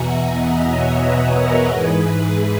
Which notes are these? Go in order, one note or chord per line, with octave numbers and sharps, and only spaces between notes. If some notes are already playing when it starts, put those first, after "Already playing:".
Already playing: E2 B2 E5 F#5 G#5 A#5
D#5 F#5
C#5 E5
B4 D#5
A#4 C#5
G#2 E3 G#4 B4